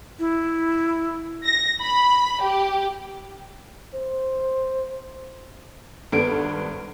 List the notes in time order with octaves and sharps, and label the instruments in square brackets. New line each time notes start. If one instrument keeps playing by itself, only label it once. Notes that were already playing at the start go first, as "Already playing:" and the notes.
[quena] E4
[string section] A#6
B5
G4
[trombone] C5
[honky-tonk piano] G#1 G2 B3 D4 A4 D7